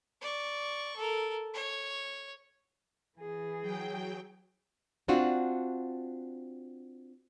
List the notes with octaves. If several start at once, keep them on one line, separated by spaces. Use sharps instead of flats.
D5 C#6
A4 A#4
C#5
E3 G#4
F#3 G5
C4 D4 F4 F#4